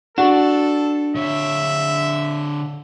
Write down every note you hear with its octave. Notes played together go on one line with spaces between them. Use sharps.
D4 F#4 A4
D3 C#5 E5